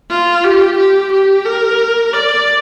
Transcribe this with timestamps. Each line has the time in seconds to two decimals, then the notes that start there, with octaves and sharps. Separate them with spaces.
0.11 F4
0.44 G4
0.78 G4
1.13 G4
1.45 A#4
2.13 D5